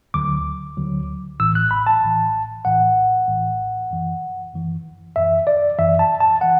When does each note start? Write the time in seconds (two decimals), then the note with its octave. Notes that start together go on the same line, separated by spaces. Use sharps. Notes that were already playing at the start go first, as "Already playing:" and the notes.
0.14 D2 D3 F#3 D6
0.77 D2 D3 F#3
1.40 A1 A2 E3 E6
1.55 F#6
1.71 B5
1.87 A5
2.02 A1 A2 E3
2.65 A1 A2 E3 F#5
3.28 A1 A2 E3
3.91 F#2 E3
4.53 F#2 E3
5.16 F#2 E3 E5
5.47 D5
5.78 F#2 E3 E5
5.99 A5
6.20 A5
6.41 E3 F#5